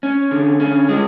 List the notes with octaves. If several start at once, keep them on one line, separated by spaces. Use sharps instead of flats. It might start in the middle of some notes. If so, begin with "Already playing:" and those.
C#4
D3
C#4
G#3